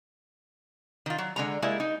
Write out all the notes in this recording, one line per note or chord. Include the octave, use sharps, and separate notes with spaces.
D#3 F4
F#3
D3 G#3 A#5
G3 G#3 A#3 E4
D#4